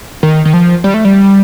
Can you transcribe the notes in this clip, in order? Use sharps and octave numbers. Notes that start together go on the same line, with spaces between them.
D#3
D#3
F3
G3
A3
G3